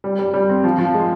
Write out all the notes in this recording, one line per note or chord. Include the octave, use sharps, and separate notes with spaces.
G3
G3
G3
C4
F3
F3
G#3